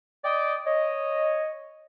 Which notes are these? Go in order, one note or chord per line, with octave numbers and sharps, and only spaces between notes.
D5 D#5 G5 D6 D#6
C#5 D#5